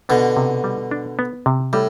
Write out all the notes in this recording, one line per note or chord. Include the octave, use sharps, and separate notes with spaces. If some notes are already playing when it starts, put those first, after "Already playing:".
B2 D3 B3
C3
G3
D4
B3
C3
A2 G3